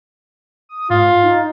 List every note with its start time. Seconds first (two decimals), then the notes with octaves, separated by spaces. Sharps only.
0.69 D#6
0.90 G#2 F4
1.23 D#4